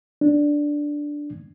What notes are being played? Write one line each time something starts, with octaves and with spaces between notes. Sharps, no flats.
D4